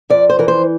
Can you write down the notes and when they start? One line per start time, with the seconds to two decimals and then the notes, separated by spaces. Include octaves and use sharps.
0.10 F2 D5
0.30 C5
0.39 E3 A#4
0.48 C5